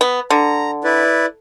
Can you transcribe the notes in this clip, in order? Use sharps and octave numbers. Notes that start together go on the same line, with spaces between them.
B3
D3 A#5
E4 B4 D5